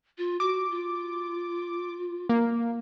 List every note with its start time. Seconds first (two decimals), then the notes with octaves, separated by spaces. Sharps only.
0.18 F4
0.40 F#4 D6
0.70 F4
2.29 A#3